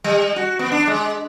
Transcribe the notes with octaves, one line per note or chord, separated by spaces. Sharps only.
G3
F#4
B3
D4
G#3